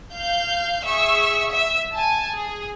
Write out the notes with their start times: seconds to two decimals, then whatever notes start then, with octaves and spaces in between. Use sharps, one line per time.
0.12 F5 G6
0.85 G#4 E5 C#6
1.52 E5
1.93 G#5 A5
2.34 G#4